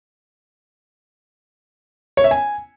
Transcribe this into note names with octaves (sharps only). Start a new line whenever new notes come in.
C#5
E5
G#5